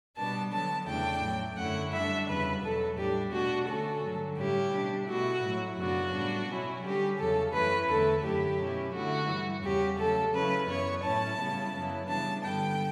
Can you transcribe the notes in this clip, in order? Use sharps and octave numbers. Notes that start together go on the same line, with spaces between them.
B2 G3 B3 D4 A5
D3 F#3 B3 A5
E2 C#3 E3 A3 D4 G5
A2 F#3 A3
F#2 D3 A3 C#4 E4 F#5
D3 G3 D4 E5
E2 C#3 G3 B4
E2 B2 F#3 A4
A2 G3 D4 G4
B2 A3 D4 F#4
D3 A3 C#4 A4
G2 D3 F#3
A2 G3 C#4 E4 G4
B2 G3 D4
B2 A3 E4 F#4
A2 F#3 A3 E4
F#2 C#3 F#3 B3 D4 F#4
A2 G3 B3 D4
B2 F#3 C#4 E4
D3 G3 C#4 G4
E2 C#3 F#3 A4
F#2 E3 A3 C#4 E4 B4
E2 D3 A3 E4 A4
F#2 D3 F#3 A3 E4 G4
B2 F#3 C#4 E4
D3 A3 E4 F#4
G2 E3 G3
E2 C#3 G3 C#4 G4
C#3 F#3 A3 A4
C#3 F#3 C#4 E4 B4
F#2 E3 B3 E4 C#5
A2 F#3 C#4 E4 A5
C#3 G3 B3 E4
F#2 C#3 F#3 B3 E4
C#3 E3 G3 B3 D4 A5
G2 D3 G3 B3 G5